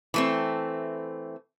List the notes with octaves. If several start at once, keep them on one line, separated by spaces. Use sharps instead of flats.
E3 A3 C4